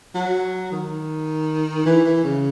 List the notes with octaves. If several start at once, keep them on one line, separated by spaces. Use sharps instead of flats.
F#3
D#3
E3
E3
C#3